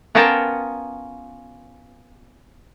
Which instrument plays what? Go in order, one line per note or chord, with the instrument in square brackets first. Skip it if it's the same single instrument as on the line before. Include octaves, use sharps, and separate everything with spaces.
[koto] B3 C#4 F4 A#4 G5 A5